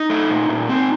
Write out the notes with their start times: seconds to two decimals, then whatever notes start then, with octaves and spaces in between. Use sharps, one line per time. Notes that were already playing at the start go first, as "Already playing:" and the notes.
Already playing: D#4
0.10 A3
0.30 A#2
0.49 A#2
0.69 C4